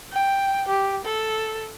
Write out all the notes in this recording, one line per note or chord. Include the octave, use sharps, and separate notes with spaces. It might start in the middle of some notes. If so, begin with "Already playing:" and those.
G5
G4
A4